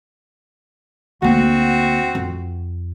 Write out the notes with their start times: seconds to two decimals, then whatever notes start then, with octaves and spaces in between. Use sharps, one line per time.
1.22 D2 A#3 C4 F#4
2.15 F2